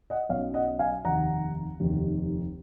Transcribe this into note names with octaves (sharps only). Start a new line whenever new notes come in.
D#5 F#5
B1 B2 F#3 C#4 C#5 F5
D#5 F#5
F5 G#5
F1 D#2 D#3 F#5 A#5
F1 D#2 D#3